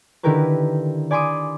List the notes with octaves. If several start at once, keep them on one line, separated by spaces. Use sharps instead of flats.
D3 D#3 E4 G4 A#4 B4
D5 G#5 B5 C6 D6 D#6